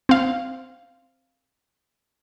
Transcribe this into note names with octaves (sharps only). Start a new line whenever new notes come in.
C4 F5